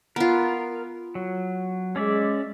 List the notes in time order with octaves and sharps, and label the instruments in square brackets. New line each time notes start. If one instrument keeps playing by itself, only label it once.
[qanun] B3 F4 [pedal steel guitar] A#4
[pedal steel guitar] F#3
[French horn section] G#3 [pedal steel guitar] C#4 D5 E5